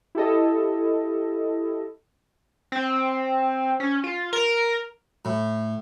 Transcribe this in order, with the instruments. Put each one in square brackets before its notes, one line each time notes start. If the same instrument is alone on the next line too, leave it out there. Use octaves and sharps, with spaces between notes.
[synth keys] E4 G4 A4 D#5
[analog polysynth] C4
C#4
F4
A#4
[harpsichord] A2